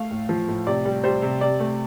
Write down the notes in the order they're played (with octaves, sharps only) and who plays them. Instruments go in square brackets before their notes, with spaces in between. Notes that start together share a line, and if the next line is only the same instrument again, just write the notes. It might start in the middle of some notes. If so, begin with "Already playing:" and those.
Already playing: [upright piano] A3 F5
A2
F3
A2
C3 D5
G3
G3 C5
C3
C3 D5
A3